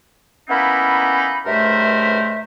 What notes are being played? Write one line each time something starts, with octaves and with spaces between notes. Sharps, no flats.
A#3 B3 C#4 D#4 E4 B5
C#2 G2 A3 A#4 C5 E5